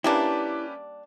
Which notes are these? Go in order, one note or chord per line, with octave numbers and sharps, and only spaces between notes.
G3 A#3 C#4 D4 E4 G4 B4